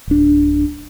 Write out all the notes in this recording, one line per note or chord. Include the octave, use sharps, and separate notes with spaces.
D1 D4